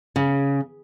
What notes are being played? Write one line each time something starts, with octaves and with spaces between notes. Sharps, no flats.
C#3